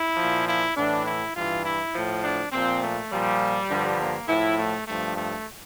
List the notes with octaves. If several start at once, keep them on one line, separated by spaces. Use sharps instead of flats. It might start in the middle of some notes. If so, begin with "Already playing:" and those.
Already playing: E4
A#2 F3
E4
A2 E3 D4
E4
G2 E3 F4
E4
A2 F3
D4
A#2 F3 C4
A3
A#2 F3 G3
G2 D3 F3
A#3
A2 F3 E4
A3
G2 F3 A3
A3